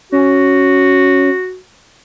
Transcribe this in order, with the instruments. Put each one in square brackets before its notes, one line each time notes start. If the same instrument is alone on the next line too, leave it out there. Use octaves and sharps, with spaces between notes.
[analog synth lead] C#4 [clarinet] F#4